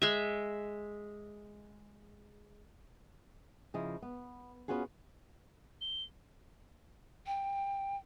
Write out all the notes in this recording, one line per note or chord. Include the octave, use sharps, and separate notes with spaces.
G#3 E5
C#3 F3 E4 D#5
B3
B3 C#4 F4 F#4 G#4
G7
G5